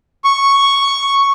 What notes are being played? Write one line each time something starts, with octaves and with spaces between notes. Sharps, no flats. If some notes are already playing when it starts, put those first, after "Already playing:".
C#6